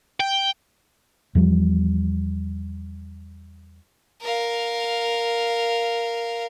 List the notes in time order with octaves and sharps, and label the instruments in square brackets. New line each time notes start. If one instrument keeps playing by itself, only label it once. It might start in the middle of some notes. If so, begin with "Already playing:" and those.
[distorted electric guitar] G5
[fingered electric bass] E2 F3 G3
[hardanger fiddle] A#4 F5